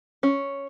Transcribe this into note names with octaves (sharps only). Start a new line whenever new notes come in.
C#4